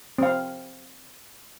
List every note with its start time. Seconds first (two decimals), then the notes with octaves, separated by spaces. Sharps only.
0.18 C4 F5